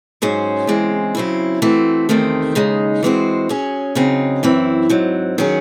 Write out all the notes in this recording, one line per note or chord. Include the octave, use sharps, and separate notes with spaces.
G#2 F#3 C#4 G#4 C5
E2 C#3 G#3 C4
C#3 F#3 C4 E4
E3 A3 C4 F#4
E2 C3 D#3 A3 C4
D#2 C#3 G#3 D#4
E3 G#3 C4 F#4 C5
F#3 C#4 G#4
C#3 F#3 C4 D#4
F#2 E3 C4 E4
G#2 F#3 C4
D#3 F#3 C#4 G#4